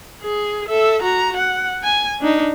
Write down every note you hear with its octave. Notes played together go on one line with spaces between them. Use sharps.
G#4
A4 E5
F#4 A#5
F#5
G#5
D4 D#4